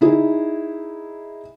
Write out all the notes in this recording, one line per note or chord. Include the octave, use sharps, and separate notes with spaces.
D#4 E4 G#4